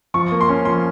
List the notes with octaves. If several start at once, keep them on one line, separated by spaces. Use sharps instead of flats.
F3 C#6
A#3
C6
C#4
F3 C6